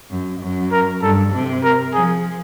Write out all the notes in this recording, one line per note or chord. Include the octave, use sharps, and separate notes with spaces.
F#2
F#2
A#4
G2 A4
C3
A#4
F3 G#4